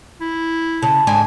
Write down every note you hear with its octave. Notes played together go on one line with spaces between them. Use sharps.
E4
C#3 A5
G#2 D4 G#5